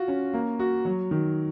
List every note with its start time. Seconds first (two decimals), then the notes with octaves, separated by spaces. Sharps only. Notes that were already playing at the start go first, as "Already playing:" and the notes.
Already playing: F4 F#4
0.08 C#4
0.34 A#3
0.59 F#4
0.85 F#3
1.11 D#3